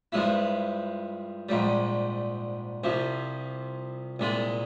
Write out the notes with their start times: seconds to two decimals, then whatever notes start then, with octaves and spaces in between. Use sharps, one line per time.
0.12 G2 F3 G#3 E4
1.49 A#1 G#2 G3
2.84 C2 C3 F3
4.19 C2 A#2 G#3